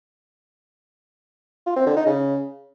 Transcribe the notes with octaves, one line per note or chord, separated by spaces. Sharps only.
F4
C4
D3
D#4
C#3